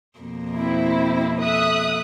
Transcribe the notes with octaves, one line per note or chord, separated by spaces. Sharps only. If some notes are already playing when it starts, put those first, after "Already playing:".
F2 B2 A#3
C4 E4
A4 E5 D#6 F#6